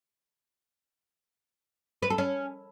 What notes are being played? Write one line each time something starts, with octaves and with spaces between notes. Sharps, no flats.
B4
A4
C#4